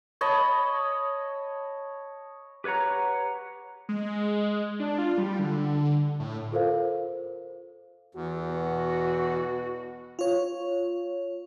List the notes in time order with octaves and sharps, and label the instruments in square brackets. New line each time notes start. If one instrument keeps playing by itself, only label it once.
[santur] C#5 D#5 A5 B5
[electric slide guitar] G4 B4 C#5 F#5 A#5
[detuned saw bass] G#3
D4
F4
G3
D3
A2
[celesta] F4 A4 A#4 C5 F5
[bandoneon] E2 [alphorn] F#4
[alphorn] B2 [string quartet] F#4
[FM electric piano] F4 C#5